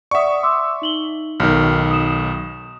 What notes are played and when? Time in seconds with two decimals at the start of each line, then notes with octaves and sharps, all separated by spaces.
0.11 D5 E5 F#5 C#6 D#6
0.43 C6 D6 E6
0.82 D#4 F#7 G7
1.40 B1 D#3 F6
1.91 D#6 E7